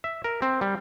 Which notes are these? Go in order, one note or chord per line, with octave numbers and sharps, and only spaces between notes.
E5
A#4
C4
G3